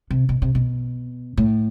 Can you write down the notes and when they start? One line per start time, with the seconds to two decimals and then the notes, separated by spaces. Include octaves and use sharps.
0.11 C3
0.29 B2
0.42 C3
0.55 B2
1.37 A2